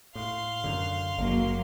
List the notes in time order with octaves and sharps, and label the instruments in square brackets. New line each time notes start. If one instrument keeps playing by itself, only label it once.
[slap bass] A2 [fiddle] F5 C6
[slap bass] F#2 D3
[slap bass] F#1 [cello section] F#3 A#3